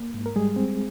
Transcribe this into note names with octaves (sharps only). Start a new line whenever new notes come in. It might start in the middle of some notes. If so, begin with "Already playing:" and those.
Already playing: A#3
G#2
A#4
G3 G#3 G#4
C4